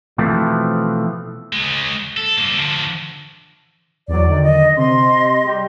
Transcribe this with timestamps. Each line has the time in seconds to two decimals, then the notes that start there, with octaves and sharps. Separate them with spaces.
0.18 B2 E3 F3 A3 C4
1.53 C#2 G#3
2.17 A4
2.37 G2 A#3
2.52 D3 F3
4.08 E2 F#3 D5
4.27 D3 D#3
4.42 D#5
4.76 C3 D#5 C6
5.44 G3 G4